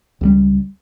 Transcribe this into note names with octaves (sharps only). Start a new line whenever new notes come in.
C#2 F#3 G3